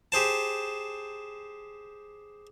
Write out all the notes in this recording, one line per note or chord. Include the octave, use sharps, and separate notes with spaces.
G4 G#4 C5 A5